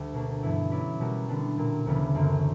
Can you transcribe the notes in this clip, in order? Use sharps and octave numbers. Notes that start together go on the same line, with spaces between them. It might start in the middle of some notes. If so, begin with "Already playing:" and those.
Already playing: D2 G3
B2 A#3 D4
G2 E3 B3 E4
F#3 C#4 E4 B4 D5
B2 G3 B3 F#4 A#4
D3 G3 B3 D4
A#2 F#3 A#3
D2 C#3 E3 G3 B3
F#2 D3 A#3